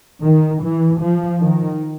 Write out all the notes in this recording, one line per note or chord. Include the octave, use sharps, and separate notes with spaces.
D#3
E3
F3
D#3